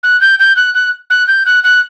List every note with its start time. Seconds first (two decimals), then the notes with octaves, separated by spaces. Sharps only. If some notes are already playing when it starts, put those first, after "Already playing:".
0.03 F#6
0.21 G6
0.39 G6
0.56 F#6
0.74 F#6
1.10 F#6
1.27 G6
1.46 F#6
1.64 F#6